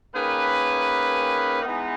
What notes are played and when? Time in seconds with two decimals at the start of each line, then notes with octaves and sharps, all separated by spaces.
0.13 D#3 A#3 C#4 G#4 B4
1.62 E3 G#3 B3 D#4